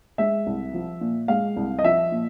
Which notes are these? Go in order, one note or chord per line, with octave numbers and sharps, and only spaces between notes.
G#3 E5
C2
F3
A#2
G#3 F5
C2
D#5
F3 E5
A#2